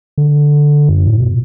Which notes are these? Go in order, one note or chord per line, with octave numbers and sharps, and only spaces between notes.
D3
F#2
A2
B2